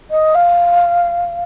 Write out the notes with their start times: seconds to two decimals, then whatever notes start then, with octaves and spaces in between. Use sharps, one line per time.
0.10 D#5
0.34 F5